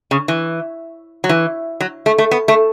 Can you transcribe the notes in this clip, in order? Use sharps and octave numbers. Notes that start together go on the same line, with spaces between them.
C#3
E3
F#3
E3
F#3
A3
A3
B3
A3